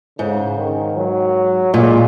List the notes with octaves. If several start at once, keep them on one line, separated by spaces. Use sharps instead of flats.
G#2 C#3
D#3
F#3
A#2 G#3